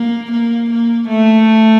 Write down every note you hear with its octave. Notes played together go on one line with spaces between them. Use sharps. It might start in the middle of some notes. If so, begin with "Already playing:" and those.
Already playing: A#3
A#3
A#3
A3